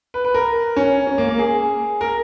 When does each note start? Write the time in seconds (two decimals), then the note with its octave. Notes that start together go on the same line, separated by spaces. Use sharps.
0.14 B4
0.24 B4
0.34 A#4
0.76 C#4
1.07 C#4
1.18 A#3
1.29 A#3
1.39 G#4
2.01 A#4